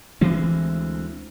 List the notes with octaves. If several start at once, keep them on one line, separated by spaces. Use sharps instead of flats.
D2 E3 G#3 C4